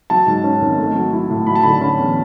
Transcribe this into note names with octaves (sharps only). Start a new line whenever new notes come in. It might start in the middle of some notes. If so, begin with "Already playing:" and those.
F#3 A5
G#2
C#4
G#1
A3
F#3
E4
A2
F#3 B5
A5
D3 B5
C#4 B5
E2